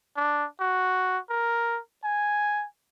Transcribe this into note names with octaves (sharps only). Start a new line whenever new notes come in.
D4
F#4
A#4
G#5